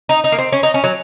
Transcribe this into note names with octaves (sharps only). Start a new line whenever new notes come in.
D#4
D#4
A#3
C4
C#4
D#4
C#4
F#3